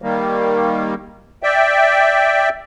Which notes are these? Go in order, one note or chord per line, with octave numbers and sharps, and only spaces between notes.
D#3 G3 A#3
D5 E5 G5